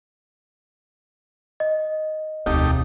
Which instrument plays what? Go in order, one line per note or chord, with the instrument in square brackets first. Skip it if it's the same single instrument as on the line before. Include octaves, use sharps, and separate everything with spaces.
[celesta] D#5
[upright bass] E1 [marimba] D2 [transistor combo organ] A3 D#4 G4